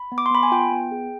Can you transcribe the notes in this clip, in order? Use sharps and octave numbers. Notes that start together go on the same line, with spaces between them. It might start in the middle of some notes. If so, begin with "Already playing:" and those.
Already playing: B5
B3
D6
C6
B3 B5
G#5
F4 G5
B3
G#4